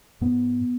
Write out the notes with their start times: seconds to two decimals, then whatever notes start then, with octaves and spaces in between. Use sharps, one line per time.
0.21 G#2 B3